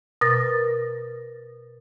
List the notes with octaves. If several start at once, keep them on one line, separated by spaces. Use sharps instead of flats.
B2 A#4 A6 A#6